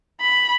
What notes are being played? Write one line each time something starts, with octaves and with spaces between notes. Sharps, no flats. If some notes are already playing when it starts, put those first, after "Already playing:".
B5